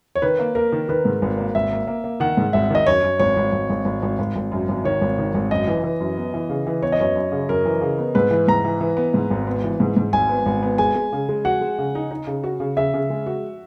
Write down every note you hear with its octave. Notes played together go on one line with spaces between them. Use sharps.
C#5
D#3 B4
A#3
A#3 A#4
D#3
D#3 B4
G#2
G#1
A#3
G#1 E5
A#3
A#3
A#3
D#3 F#5
G#2
G#1 E5
D#3 D#5
F#2 C#5
F#2
G#1 C#5
G#1
G#1
G#1
G#1
G#1
G#1
G#1
F#2
G#1
D#3 C#5
G#1
D#3
G#1
F#2 D#5
E3
E3
F#2
B3
E3
C#3
E3
B3 C#5
D#5
F#2 C#5
F#2
C#3
F#2 A#4
E3
C#3
B3
G#2 B4
E3
G#2 A#5
E3
E3
B3
G#2
G#1
B3
E3
G#2
G#2
G#1 G#5
B3
G#1
B3
G#3 G#5
G#3
C#3
G#3
F#4 F#5
G#3
C#3
D#4
D#4
C#3
F#4
C#3
C#3 E5
C#3
G#3
F#4